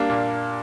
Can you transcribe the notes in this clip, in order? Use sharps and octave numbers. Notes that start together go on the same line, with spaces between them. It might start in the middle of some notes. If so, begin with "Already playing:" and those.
Already playing: G3 A#3 D4
A#2